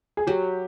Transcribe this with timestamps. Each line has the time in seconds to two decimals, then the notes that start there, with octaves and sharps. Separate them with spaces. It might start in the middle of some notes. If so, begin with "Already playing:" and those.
0.17 G#4
0.27 F#3 G4